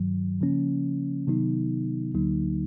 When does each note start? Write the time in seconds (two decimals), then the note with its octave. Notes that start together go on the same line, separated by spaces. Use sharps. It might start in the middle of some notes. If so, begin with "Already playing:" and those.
Already playing: G2 D#3 F#3
0.41 C#3 F3 A#3 C#4
1.27 C3 D#3 F#3 B3 D#4
2.14 D2 D3 F#3 A#3 D#4